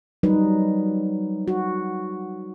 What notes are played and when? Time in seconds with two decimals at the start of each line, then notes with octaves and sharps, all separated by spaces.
0.23 F#3 G3 D#4 B4
1.48 F#4